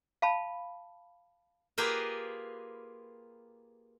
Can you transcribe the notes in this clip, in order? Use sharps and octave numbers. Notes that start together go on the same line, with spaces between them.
F5 A5 B5
A#3 F4 G4 G#4 A#4 B4